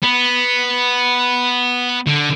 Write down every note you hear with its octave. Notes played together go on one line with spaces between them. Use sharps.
B3
D3